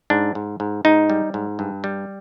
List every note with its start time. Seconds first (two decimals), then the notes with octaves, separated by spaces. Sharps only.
0.10 G#2 D4
0.35 G#2
0.60 G#2
0.85 G#2 D#4
1.10 G3
1.34 G#2
1.59 G2
1.84 G3